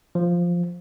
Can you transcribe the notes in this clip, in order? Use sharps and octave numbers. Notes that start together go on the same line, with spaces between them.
F3